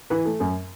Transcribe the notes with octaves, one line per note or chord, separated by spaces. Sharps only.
E3 B4
A3
F#2